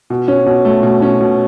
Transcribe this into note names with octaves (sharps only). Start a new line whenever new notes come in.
B2
C#4
B2
A3
B2
C#4
B2